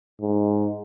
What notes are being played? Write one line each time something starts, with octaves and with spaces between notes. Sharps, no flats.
G#2